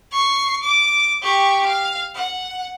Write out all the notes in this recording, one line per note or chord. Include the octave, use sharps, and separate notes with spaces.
C#6 C7
D6
G4 C#6
F5
F#5